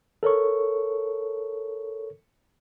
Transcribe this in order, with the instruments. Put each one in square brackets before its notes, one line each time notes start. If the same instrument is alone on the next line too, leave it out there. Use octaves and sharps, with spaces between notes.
[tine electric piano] A4 A#4 C#5 C#6